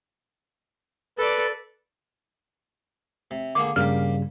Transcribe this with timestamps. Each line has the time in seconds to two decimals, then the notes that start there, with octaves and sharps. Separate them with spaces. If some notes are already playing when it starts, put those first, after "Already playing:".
1.18 A4 B4 D5
3.31 C3
3.55 D3 A#3 G#4 D6
3.76 G2 C#3 G3 A#3 G4 F6